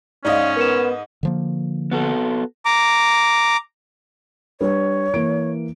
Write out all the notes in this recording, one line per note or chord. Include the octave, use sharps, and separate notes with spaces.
G#2 C#4 D5 D#5 F5
B3 A#4 C#7 E7
D3 F3 A#3
B3 F#4 A4
A#5 D6
G3 D4 B4 C#5
E3 A#3 D7